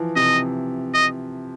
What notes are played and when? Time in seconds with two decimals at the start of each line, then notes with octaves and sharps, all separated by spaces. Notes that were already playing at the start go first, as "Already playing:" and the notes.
Already playing: E3 F3
0.16 C3 D#5
0.94 D#5